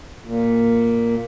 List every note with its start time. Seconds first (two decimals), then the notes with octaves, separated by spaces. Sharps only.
0.24 A#2